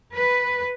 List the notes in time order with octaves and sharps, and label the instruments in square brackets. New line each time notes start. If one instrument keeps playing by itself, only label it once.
[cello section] B4